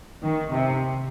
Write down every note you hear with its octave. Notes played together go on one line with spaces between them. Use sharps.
D#3
C3